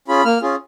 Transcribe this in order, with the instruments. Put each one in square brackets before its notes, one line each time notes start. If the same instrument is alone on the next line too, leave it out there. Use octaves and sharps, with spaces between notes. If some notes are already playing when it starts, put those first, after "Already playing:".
[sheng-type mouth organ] C#4 F4 G#4 B5
A#3 F6
C#4 F4 G#4